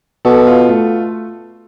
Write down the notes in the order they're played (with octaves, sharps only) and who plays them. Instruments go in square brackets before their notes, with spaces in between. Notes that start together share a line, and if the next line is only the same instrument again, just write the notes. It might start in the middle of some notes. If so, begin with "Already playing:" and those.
[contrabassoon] B2 [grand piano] A4
[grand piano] F4
A3